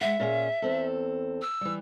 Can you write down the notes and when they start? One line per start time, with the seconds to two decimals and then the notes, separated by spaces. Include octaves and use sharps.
0.01 G#3 E5 F#5
0.20 A#2 C#4 G#4
0.62 E2 C4 A4
1.42 E6
1.61 E3 G3